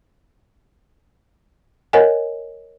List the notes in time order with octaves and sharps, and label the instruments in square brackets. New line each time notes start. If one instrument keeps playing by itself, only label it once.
[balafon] A#4 C#5 D#5 F#5 G#5